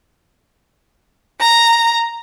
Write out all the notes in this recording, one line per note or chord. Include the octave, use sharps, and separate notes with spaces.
A#5